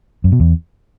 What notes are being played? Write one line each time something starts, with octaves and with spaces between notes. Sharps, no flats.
F#2
B2
E2